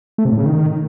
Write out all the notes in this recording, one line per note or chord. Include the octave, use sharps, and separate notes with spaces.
A3
C3
A2
C#3
D#3